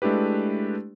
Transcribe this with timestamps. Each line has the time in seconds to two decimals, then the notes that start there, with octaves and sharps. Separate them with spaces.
0.02 G#3 A3 D4 E4 G4 B4